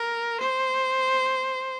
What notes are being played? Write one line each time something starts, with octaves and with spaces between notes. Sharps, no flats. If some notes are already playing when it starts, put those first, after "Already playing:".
Already playing: A#4
C5